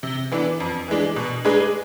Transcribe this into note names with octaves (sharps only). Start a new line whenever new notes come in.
C3
E3 B3 D4
F2
E3 G#3 D4
B2
G#3 D4 G#4 B4